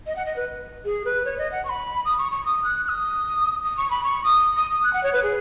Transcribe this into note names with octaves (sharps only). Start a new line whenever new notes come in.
D#5
F#5
D#5
B4
G#4
B4
C#5
D#5
F#5
C#6
B5
D#6
C#6
C#6
D#6
F#6
F#6
D#6
D#6
C#6
B5
C#6
D#6
D#6
D#6
F#6
F#5
C#5
B4
G#4